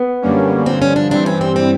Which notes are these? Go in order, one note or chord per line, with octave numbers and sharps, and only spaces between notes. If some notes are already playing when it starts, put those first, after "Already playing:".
Already playing: B3
F#2 D3 G3 A#3 C#4
G2 D3 F3 C4
C#4
D4
G2 E3 G3 C4 D4
C#4
C4
C4